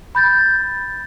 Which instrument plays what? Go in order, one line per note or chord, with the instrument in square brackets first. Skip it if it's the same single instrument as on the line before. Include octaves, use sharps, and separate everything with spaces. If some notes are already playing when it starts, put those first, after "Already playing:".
[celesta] B5 G6 A6